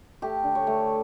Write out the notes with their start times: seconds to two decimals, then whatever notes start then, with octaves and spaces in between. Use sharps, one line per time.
0.22 A3 G4
0.44 D3
0.55 C#5
0.67 A3